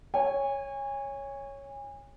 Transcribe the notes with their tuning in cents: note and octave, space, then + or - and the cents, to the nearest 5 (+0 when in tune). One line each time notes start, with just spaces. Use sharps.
C#5 +0 G#5 -30